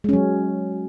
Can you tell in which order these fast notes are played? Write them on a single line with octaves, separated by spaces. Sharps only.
G#3 C#4 F#3